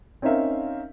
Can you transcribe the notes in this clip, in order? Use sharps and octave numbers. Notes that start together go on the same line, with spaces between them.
C4 C#4 D#4 A#4 E5 F5